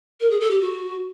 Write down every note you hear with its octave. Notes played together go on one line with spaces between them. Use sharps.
A#4
G#4
A4
G4
F#4